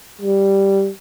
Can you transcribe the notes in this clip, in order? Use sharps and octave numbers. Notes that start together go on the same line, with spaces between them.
G3